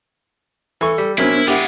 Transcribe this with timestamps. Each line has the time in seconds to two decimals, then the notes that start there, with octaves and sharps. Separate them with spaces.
0.81 E3 A4 C#6
0.98 G3
1.18 C3 F#3 B3 C#4 D4 E4 A#4 C5
1.48 G#3 E4 G4 D5 F#5